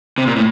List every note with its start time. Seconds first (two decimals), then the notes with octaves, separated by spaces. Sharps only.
0.18 C3
0.26 A#2
0.36 A2